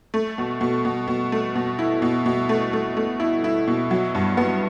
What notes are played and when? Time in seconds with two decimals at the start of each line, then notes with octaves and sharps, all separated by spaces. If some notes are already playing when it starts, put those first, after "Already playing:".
0.14 A3
0.38 B2
0.61 B2
0.85 B2
1.07 B2
1.32 A3
1.55 B2
1.79 E4
2.02 B2
2.26 B2
2.49 A3
2.73 A3
2.97 A3
3.20 E4
3.44 E4
3.68 B2
3.91 F#3
4.15 G2
4.37 B3